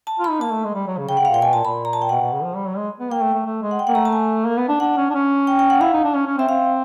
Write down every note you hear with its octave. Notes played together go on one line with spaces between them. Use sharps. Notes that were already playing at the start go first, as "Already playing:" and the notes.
A5
F4
B5
D#4
A#3 A5
A3
G#3
G3
F#3
C#3
C#3 G5
F#5
C#3 F5
A#2 G5
B2 G#5
A#2 A5
A#2 B5
A#5
A5
G5
B2 F#5
B2
C#3
F3
G3
F#3
G#3
B3
A#3 G5
A3
A3
A3
G#3
F#5
G5
A#3 F#5
A3 A#5
A5
G#5
A#3
B3
D4
D4 F#5
C#4
D4
C#4
G5
G5
F#5
E4 F5
D#4
D4
C#4
C#4
C4 E5
C4 F5